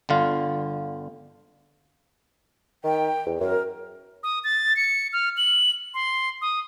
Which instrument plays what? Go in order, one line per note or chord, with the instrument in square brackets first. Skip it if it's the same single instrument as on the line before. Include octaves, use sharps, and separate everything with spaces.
[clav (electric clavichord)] G1 D3 F4
[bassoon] D#3 [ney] G5
[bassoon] E2
[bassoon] F#2 [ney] A#4
[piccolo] D#6
A6
C#7
F6
F#7
C6
D#6